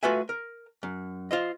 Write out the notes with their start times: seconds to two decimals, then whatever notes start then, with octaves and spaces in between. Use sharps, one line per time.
0.03 A3 F4 F#4 B4 E5 G#5
0.29 A#4
0.83 F#2
1.31 F4 C5 D#5